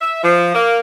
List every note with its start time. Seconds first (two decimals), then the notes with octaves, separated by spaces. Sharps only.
0.01 E5
0.23 F3
0.55 A#3